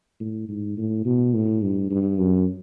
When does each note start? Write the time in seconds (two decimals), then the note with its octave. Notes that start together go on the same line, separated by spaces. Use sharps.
0.20 A2
0.48 G#2
0.77 A2
1.05 B2
1.34 A2
1.62 G2
1.90 G2
2.19 F#2